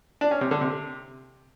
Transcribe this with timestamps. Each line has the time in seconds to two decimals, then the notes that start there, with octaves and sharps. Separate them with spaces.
0.21 D4
0.31 C#4
0.41 C3
0.51 D3
0.61 C3